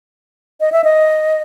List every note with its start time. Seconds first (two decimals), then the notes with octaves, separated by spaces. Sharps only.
0.60 D#5
0.72 E5
0.84 D#5